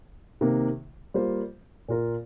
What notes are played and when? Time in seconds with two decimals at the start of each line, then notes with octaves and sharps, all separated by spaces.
0.41 C3 D#3 A#3
1.14 G3 A#3 F4 C5
1.89 A#2 A#3 F4 A#4